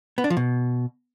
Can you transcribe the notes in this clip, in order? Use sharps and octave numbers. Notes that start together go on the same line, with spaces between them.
B3
D4
F3
B2